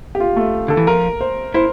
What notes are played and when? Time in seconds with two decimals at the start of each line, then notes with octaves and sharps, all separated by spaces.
0.15 G4
0.20 F4
0.36 A3
0.68 D3 A4
0.77 E3
0.87 F3 A#4
1.21 C5
1.54 E4 C5